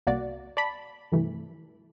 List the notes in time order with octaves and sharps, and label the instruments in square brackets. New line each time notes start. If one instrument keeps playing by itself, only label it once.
[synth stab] C2 A#3 F#4 D5
D5 A5 B5
G2 C3 E3 A3